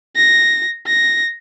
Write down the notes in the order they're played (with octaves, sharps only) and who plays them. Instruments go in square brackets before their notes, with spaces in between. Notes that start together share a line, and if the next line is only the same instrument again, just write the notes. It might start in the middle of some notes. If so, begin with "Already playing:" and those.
[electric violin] A#6
A#6